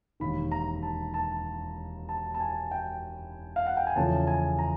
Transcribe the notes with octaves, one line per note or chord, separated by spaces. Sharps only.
E1 D#2 D#3 B5
A#5
A5
A5
A5
A5
G#5
G5
F5
F#5
G5
G#5
E2 C#3 F3 A3 C#4 A5
G#5
A#5